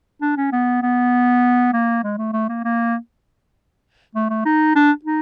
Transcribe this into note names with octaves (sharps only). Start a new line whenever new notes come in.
D4
C#4
B3
B3
A#3
G#3
A3
A3
A#3
A#3
A3
A3
D#4
D4
D#4